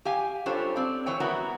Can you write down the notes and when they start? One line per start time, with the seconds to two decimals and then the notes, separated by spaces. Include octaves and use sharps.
0.05 G4 F5 G#5
0.46 G3 D4 F4 A4 C5 C#5
0.76 C4 D5
1.06 E3 C5 C#5 G5
1.20 G3 B3 E4 F#4 A#4